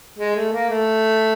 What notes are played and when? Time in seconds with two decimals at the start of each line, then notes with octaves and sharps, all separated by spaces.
0.19 G#3
0.36 A3
0.52 A#3
0.69 A3